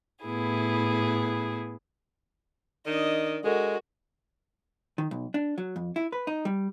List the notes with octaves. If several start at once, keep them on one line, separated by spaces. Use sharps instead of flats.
A2 B3 E4 G#4
D#3 D4 D#5
G#3 F#4 A4 A#4
D#3
B1
D4
F#3
F2
E4
B4
D#4
G3